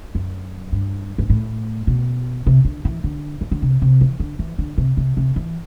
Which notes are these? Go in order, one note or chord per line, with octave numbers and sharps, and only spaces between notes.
F#2
G2
G2
A2
B2
C3
D3
E3
D3
E3
D3
C3
C3
E3
D3
E3
D3
C3
C3
C3
E3